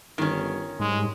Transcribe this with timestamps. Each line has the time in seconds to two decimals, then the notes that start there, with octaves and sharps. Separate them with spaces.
0.18 G1 D#3 C#4
0.80 G#2 G3 G#3